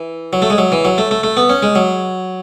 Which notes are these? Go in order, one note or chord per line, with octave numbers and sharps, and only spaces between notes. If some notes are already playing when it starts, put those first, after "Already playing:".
Already playing: E3
F#3
A3
G#3
F#3
E3
F#3
A3
A3
A3
B3
C#4
G#3
F#3